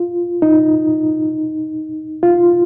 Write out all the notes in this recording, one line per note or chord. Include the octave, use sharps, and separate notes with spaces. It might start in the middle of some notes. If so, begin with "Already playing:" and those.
Already playing: F4
D#4
F4